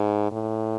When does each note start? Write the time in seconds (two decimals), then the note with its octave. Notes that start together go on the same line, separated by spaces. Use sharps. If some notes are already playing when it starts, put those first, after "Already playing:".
Already playing: G#2
0.32 A2